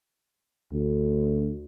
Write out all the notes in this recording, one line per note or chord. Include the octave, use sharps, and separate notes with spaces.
D2